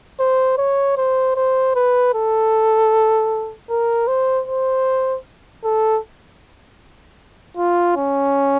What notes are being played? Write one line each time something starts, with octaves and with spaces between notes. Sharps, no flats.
C5
C#5
C5
C5
B4
A4
A#4
C5
C5
A4
F4
C#4